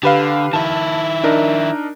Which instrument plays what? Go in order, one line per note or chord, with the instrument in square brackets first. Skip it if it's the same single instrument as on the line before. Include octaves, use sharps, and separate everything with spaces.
[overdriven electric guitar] D3 [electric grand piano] G4 B4 F5
[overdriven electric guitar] D#3 E4 [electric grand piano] A5
[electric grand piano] D4 D#4 A#4